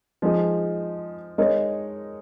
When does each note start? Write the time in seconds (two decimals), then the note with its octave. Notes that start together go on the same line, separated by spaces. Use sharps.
0.22 F3 G#3 D#4 G#4
1.38 G#3 D#4 A#4 C#5